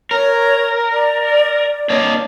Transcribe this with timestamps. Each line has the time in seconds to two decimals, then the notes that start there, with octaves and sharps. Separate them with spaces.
0.11 A#4 C#5
0.91 D5
1.90 A#3 D4 C#5 D#5